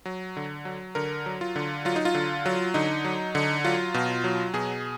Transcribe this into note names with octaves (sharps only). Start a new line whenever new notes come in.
F#3
D3
F#3
D3 A#4
F#3
F4
D3
F#3 F4
D#4
F4
D3
F#3
D3 D#4
F#3
D3
F#3 F4
B2
F#3
B2 G#4